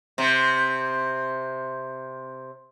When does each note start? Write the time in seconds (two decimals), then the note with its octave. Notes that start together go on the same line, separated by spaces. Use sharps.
0.18 C3 C4